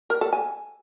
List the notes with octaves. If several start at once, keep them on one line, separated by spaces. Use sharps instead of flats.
A#4
A4
G#5